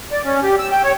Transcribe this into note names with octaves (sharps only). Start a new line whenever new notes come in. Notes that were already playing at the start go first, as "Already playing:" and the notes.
D5
C#4
G4
E6
G5
C#5